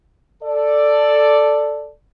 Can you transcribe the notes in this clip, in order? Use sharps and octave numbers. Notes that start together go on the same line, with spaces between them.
A4 D5